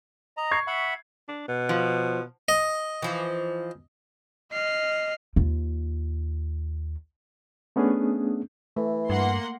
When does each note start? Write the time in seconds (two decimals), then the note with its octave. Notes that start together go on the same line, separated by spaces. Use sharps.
0.37 D#5 A#5
0.51 C#6 G#6 C7
0.67 E5 F#5 B5
1.28 D4
1.48 B2
1.69 F3
2.49 D#5
3.02 E3 F3
4.53 D#5 F6 C7
5.36 D#2 F4
7.76 A3 B3 C#4 D4 G#4
8.77 E3 A3
9.10 G2 A#3 F#5 C6